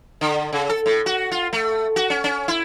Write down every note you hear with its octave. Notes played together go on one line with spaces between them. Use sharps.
D3
C#3
A4
A2
F#4
F4
A3
F#4
C#4
C#4
E4